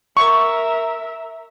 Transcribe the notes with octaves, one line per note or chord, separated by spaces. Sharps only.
A#4 E5 C#6